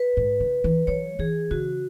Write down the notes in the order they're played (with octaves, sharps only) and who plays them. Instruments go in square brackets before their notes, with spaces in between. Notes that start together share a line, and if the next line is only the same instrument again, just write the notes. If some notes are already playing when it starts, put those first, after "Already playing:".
Already playing: [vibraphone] B4
[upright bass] G#2
C#3
E3
[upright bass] F#3 [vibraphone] C#5
[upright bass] E3 [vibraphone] G#4
[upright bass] C#3 [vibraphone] F#4